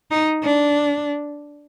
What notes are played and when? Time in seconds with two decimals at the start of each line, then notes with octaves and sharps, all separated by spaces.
0.11 D#4
0.44 D4